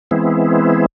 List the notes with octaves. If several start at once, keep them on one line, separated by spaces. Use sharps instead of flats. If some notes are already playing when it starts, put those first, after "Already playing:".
E3 G#3 B3 C4 E4